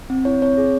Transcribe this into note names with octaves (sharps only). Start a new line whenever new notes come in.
C4
E4 C#5
C4 C#5
G#4